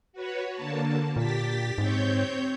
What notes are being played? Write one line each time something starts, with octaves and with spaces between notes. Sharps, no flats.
F#4 B4 C#5
D3 A#3 A5
A#2 G4 A6 B6
G#2 C4 C#5 G6